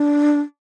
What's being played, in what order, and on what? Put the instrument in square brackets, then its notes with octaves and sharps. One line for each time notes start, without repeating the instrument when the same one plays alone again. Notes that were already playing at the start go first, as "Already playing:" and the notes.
Already playing: [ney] D4